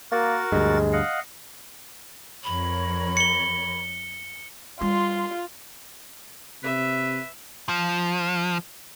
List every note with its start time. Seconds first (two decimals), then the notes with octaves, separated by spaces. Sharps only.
0.12 A#3 F#4 A#4 A6
0.52 D2 G2 G#3
0.93 D#5 F5 F#5
2.44 F2 A#4 C#5 B5
3.17 C#7 G7
4.81 G3 F4 C6
6.64 C3 B4 E5
7.69 F3